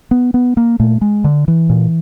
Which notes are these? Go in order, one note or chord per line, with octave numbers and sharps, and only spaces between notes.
B3
B3
A#3
A#2 A3
G#3
D3
E3
A#2